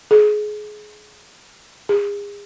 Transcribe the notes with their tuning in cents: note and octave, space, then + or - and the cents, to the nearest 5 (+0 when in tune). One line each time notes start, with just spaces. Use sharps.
G#4 +25
G#4 -35